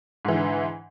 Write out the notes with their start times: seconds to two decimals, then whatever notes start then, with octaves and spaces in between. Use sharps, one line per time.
0.25 G#2
0.28 E3
0.32 D3